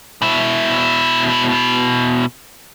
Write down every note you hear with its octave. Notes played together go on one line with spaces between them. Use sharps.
B2 E4